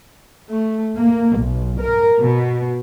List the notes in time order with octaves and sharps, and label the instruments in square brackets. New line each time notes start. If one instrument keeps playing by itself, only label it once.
[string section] A3
A#3
B1
A#4
B2